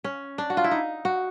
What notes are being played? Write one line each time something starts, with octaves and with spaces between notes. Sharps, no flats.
C#4
D4
F#4
F4
E4
D#4
F#4